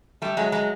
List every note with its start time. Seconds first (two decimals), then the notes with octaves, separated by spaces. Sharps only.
0.22 G3 A3
0.37 F#3 G#3
0.52 F#3 G#3